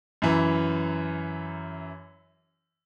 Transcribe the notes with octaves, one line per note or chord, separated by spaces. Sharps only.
F#2 E3